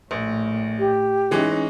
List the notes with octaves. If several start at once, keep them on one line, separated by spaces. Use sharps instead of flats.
A#1 A2
G4
E3 G#3 C#4 D#4